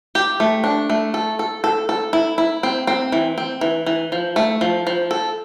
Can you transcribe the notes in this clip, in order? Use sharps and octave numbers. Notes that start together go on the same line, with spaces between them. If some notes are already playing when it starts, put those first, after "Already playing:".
G4
A3
D4
A3
A4
A4
A4
A4
E4
E4
C4
C4
E3
C4
E3
E3
F3
A3
F3
F3
A4